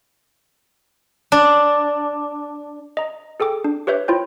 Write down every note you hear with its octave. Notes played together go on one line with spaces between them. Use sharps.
D4
D#5 A#5
G#4 A4 G5 D6
D4
G4 B4 C#5 E5 G6
E4 F4 C5 C#5 G5 G6